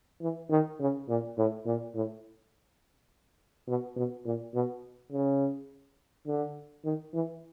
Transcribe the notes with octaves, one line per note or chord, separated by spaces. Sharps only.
E3
D#3
C#3
A#2
A2
A#2
A2
B2
B2
A#2
B2
C#3
D3
D#3
E3